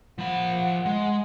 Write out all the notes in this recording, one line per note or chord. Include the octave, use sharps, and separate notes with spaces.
F3 F#5 B5
G#3